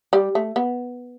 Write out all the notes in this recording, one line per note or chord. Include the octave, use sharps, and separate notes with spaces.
G3
A3
B3